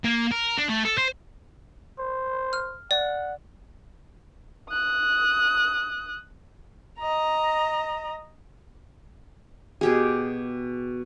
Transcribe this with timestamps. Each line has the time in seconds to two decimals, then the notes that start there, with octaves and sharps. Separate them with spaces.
0.04 A#3
0.31 A#4
0.58 D4
0.69 A3
0.85 A4
0.98 C5
1.98 C5
2.53 F6
2.91 D5 F#5
4.70 D#6 F#6
7.00 D#5 A#5
9.81 B2 G4 G#4